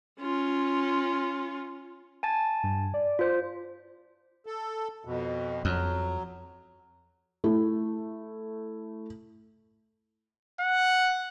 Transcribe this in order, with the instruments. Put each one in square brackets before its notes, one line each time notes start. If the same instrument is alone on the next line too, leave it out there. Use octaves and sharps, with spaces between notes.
[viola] C#4 F4
[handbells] G#5 A5 A6
[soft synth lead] G2
D5
[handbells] F4 C5
[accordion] A4
F2 B2
[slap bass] F2 [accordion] F#3
[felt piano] A3 E4
[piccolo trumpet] F#5